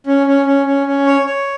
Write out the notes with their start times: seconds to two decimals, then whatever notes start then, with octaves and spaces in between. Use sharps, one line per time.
0.07 C#4
0.27 C#4
0.46 C#4
0.66 C#4
0.87 C#4
1.06 C#5
1.26 C#5